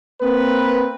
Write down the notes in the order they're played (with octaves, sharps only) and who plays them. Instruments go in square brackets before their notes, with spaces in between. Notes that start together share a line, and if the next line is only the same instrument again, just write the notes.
[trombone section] A#3 C4 B4